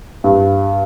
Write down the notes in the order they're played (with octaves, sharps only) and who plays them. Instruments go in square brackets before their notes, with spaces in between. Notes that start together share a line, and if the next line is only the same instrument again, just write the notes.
[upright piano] G2